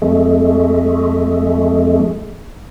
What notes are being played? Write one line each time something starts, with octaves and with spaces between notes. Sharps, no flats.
F2 G#3 A3